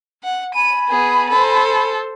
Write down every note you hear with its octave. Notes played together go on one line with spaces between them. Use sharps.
F#5
G#5 A5 B5 D#7
B3 G#4
A4 C5